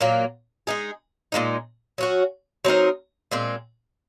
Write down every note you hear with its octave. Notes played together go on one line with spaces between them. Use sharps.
A#2 F#3 A#3
G#3 D#4 G#4
A#2 F3 G#3 D#4
F#3 C#4 F#4
F#3 C4 D#4 A#4
A#2 G#3 C4